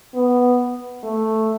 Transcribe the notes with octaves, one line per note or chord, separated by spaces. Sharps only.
B3
A3